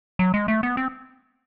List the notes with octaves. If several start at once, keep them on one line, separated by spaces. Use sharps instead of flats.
F#3
G#3
A3
B3
C4